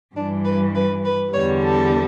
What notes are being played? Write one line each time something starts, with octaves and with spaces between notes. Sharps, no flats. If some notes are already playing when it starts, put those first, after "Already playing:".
G2 E3 G3 D4
B4
B4
B4
E2 D3 G3 C#5
A4